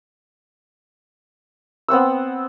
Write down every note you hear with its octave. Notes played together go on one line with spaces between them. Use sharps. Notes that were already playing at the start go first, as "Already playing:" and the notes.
B3 C4 F#5 E6